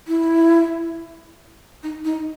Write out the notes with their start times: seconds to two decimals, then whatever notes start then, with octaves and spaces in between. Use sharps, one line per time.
0.08 E4
1.83 D#4
2.05 D#4